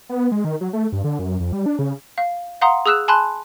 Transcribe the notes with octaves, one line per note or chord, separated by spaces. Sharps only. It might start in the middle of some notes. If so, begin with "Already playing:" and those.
B3
G#3
D#3
F#3
A3
G2
D3
F#2
F2
G3
D4
C#3
F5
F5 F#5 A#5 C6 D#6
G#4 D#6 E6 F#6 E7
G#5 A5 B5 C6 F#6